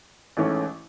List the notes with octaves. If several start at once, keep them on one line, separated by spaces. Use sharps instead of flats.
A1 G#2 E3 A3 C#4